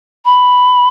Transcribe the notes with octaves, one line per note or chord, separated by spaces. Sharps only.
B5